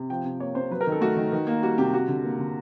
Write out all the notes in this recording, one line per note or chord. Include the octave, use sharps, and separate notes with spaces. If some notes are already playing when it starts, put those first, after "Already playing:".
Already playing: C3
F3 G5
C3
A#3 C#5
C3 C5
F#3 B4
A#4
D#3
A4
A3 F#4
D#3
D#3
A#3
G3 F#4
C3 G4
G3 F#4
D3
A#3
D3